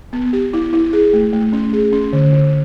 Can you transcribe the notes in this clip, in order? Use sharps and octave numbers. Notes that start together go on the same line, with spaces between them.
B3
G4
E4
E4
G#4
A3
A3
C#4
G#4
C#4
D3
D3